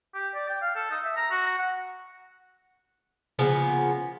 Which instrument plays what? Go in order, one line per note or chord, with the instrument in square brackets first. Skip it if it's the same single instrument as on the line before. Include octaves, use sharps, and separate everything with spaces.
[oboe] G4
D5
G5
F5
A4
D#4
E5
A#5
F#4
F#5
[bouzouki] C#3 F3 A#3 B3